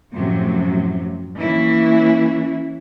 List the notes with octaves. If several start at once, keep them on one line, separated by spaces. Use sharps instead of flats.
F#2 A2 C3 F3 F#3
E3 A#3 C#4 E4